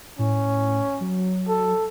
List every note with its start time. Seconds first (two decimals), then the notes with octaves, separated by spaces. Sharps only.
0.19 A2 C#4
1.00 F#3
1.49 A4